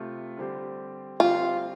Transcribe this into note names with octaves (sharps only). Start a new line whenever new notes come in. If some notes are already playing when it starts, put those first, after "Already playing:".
Already playing: C3 A3 F4
D3 G3 C4 G4 C5
D3 G3 C4 F4 G4 C5